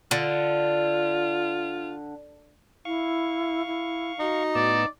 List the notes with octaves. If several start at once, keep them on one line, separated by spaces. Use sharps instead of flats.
D3 F4
E4 F5 C#6
E4
D#4 F#4
A2 B3 D5 E6